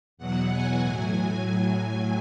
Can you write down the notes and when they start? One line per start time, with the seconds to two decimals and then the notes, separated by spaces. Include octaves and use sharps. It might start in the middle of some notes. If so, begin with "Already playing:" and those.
0.17 E2 B2 F#3 F#5
0.50 G#5
0.80 A2 F#3